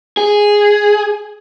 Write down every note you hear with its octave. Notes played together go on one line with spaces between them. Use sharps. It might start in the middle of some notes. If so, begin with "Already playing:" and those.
G#4